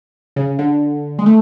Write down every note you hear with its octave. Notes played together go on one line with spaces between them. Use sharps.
C#3
D3
G#3
A3